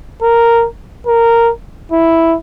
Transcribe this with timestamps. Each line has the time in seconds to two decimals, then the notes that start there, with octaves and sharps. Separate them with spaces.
0.22 A#4
1.07 A#4
1.92 E4